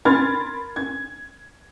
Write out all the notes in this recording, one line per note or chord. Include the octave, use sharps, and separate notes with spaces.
A#4 B5 C6 F6 G#6 A6
G#6